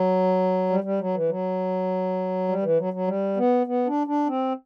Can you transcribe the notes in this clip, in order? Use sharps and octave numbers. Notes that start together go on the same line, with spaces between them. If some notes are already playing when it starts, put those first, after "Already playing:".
Already playing: F#3
G3
G3
F#3
E3
F#3
G3
E3
F#3
F#3
G3
B3
B3
D4
D4
C4